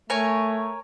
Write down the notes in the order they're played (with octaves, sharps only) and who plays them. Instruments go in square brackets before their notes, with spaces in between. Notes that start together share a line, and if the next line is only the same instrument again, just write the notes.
[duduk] A3 [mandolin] A#4 C#5 G#5